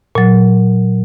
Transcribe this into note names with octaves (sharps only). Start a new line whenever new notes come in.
A#2 F#3